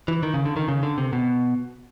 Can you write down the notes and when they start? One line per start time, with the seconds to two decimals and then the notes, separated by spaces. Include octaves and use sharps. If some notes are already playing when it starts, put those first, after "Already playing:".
0.08 E3
0.23 D#3
0.34 C#3
0.45 D3
0.57 D#3
0.68 C#3
0.83 D3
0.98 C3
1.13 B2